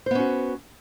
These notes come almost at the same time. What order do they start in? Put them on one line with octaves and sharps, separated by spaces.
C5 B3 C#4 F#4